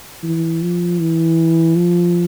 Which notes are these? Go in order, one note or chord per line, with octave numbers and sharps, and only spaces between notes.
E3
F3
E3
F3